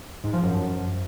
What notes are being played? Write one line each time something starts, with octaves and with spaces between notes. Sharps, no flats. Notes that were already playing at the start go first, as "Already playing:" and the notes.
G#2
F3
F#2